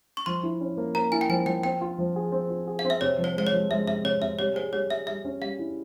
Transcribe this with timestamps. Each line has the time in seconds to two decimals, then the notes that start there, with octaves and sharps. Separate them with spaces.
0.17 C#6
0.26 F3 C6
0.43 E4
0.61 C#4
0.77 A#3
0.95 A#3 A#5
1.12 E4 G#5
1.21 G5
1.29 F3 G#5
1.46 F3 G5
1.63 C4 G5
1.81 F4
1.98 F3
2.16 G#4
2.32 C4
2.50 F4
2.68 G#4
2.79 F5
2.85 C4
2.90 E5
3.01 C3 C#5
3.18 F3
3.24 C5
3.36 G#3 C5
3.47 C#5
3.53 F3
3.70 G#3 E5
3.87 C3 E5
4.04 C3 C#5
4.22 C3 E5
4.39 G3 C#5
4.56 G#4 C5
4.73 G3 C#5
4.90 G#4 E5
5.07 G3 E5
5.25 C#4
5.42 G3 F5
5.59 E4